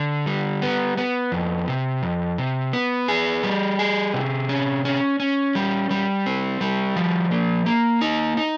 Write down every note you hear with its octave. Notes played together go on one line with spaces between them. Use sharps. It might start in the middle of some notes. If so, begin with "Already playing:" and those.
Already playing: D3
G3
B3
B3
F2
C3
F2
C3
B3
G#4
G3
G#4
C3
C#4
C#4
C#4
G3
G3
C4
G3
F3
A#3
A#3
D#4
D#4